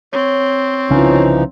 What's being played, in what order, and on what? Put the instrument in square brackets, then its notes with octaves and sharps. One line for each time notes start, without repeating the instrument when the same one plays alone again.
[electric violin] C4 [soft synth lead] C#5
[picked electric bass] C2 C#3 C#4 [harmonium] E3 F3 D#4